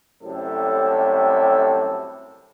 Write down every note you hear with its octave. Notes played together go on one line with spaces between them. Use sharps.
F#2 A2 C3 G3 A4